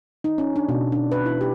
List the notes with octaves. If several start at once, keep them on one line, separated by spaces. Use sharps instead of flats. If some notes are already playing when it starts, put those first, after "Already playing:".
D#4
C#4
D4
B2
D4
B4
E4
G4